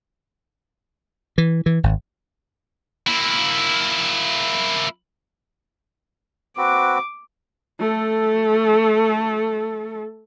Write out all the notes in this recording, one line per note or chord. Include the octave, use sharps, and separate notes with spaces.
E3
E3
G#1
A#3 E4
C4 F#4 B4 D6
A3 A4